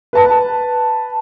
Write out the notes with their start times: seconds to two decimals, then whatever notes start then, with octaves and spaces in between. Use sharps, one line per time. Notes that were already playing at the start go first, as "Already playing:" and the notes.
0.13 B4 A5